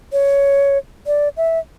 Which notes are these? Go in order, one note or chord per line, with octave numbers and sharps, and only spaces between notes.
C#5
D5
E5